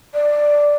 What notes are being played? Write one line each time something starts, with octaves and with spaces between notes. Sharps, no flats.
D5